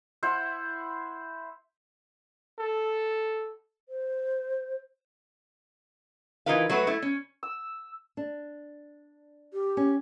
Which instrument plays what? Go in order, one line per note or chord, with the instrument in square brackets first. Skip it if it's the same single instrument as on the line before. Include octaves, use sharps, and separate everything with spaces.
[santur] E4 C5 F#5
[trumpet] A4
[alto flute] C5
[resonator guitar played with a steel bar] E3 D#4 F4 A#4 B4 F5
F#3 A3 F#4 B4
A3 E4
C#4
[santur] E6
[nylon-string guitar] D4
[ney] G4
[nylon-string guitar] C#4